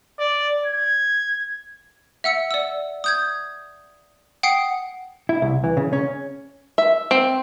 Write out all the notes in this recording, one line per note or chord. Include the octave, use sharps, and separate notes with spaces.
D5
G#6
E5 F#5 E6 C#7
D5 E6
D#6 G6 G#6
F#5 G5 D#6 C7
E4
C2
E3
C#3
C#4
E5
C4